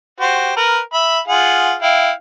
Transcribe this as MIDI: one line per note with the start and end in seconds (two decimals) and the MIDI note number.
0.20 0.52 66
0.20 0.52 67
0.20 0.52 72
0.56 0.79 70
0.56 0.79 71
0.94 1.20 76
0.94 1.20 83
1.28 1.74 65
1.28 1.74 68
1.28 1.74 78
1.82 2.11 64
1.82 2.11 77
1.82 2.11 79